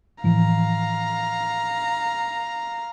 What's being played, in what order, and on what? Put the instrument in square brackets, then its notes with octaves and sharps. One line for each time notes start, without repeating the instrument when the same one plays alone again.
[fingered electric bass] A2 E3 F3 [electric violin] F5 A#5